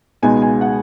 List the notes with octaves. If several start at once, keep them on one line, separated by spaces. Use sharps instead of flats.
C#2 B2 G#3 B3 D#4 G#5
G#5
F#5